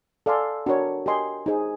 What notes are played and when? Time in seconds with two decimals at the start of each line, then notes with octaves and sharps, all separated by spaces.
0.26 A4 D5 F5 G#5 C6
0.66 D4 F#4 A#4 C#5
1.06 G4 A#4 D#5 G#5 C6
1.46 D#4 G#4 C5